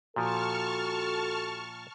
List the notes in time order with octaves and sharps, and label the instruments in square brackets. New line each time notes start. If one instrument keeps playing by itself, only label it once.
[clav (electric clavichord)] A#2 F3 [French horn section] F#4 A4 [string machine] A5 C#6 F6